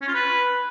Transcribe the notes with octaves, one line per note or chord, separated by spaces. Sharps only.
C#4
F4
B4